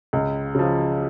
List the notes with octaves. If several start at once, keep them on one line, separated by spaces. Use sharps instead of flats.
C#2
C#3 F3